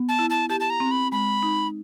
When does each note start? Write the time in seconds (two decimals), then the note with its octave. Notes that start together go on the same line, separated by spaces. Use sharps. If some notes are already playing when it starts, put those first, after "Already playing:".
Already playing: B3
0.09 A5
0.19 E4
0.30 A5
0.50 G4 A5
0.60 A5
0.70 A#5
0.80 C4
0.91 B5
1.12 G#3 B5
1.43 D#4